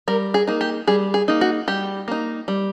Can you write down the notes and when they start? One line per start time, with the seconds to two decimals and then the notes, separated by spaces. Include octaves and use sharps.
0.08 G3 A#4
0.34 G#4
0.47 A#3 D#4
0.61 G4
0.87 G3 G#4
1.14 G#4
1.28 A#3 D#4
1.41 F#4
1.68 G3 G4
2.08 A#3 D#4
2.48 G3